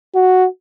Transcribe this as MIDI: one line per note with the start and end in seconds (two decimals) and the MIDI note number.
0.15 0.47 66